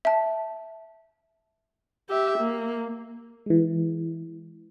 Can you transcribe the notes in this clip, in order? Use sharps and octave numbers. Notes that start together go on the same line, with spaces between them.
E5 A5
G4 E5
A#3
E3 G#3